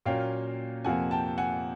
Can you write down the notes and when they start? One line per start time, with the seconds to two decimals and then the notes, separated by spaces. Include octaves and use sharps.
0.06 A#2 F#3 A#3 C#4 F5 G5
0.85 F2 C3 F3 A#3 F#5 G#5
1.11 G5 A5
1.38 F#5 G#5